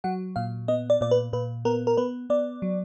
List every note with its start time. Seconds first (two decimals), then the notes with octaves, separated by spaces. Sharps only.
0.04 F#3 F#5
0.36 A#2 F5
0.68 B3 D#5
0.90 D5
1.01 A#2 D5
1.11 B4
1.33 A#2 B4
1.65 B3 A#4
1.87 A#4
1.97 B3 B4
2.30 B3 D5
2.62 F#3